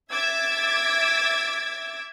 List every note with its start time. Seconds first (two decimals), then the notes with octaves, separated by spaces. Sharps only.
0.11 E5 D6 E6 G#6 A6